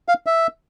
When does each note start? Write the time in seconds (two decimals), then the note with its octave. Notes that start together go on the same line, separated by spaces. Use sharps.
0.08 F5
0.26 E5